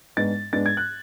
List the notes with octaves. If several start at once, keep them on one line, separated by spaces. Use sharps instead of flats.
G#2 G#3 B3 D4 A6
G#2 G#3 B3 D4 A6
G#6
F#6